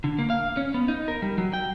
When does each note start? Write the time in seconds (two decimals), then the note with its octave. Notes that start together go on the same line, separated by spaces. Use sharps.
0.04 D3
0.19 A#3
0.30 F5
0.57 C#4
0.74 B3
0.88 D#4
1.08 A#4
1.22 G3
1.38 F#3
1.54 G5